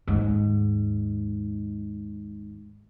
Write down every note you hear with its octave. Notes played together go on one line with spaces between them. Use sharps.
D#2 G#2